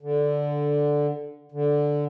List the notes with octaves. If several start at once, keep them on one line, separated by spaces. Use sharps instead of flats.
D3
D3